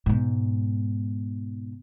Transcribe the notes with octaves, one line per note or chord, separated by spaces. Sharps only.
G#2 B2